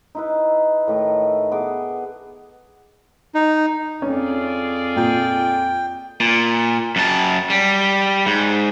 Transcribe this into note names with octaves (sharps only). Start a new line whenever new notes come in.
D#4 E4 B4
A2 D#3 A3
B3 G#4 D6
D#4
F2 C#4 F4 G#4 D5
A#2 G5
A#2
F#2 A5
G3
G#2